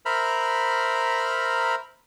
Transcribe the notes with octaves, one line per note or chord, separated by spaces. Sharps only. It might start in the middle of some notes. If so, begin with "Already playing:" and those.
A#4 C5 E5 A#5 B5 F6